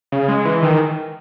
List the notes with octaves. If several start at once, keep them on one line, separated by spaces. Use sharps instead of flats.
C#3
G#3
E3
D#3